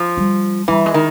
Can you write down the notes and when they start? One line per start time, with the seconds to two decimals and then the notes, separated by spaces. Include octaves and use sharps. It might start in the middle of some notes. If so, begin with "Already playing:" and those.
Already playing: F3
0.17 G3
0.68 E3 G3
0.86 G#3
0.94 D#3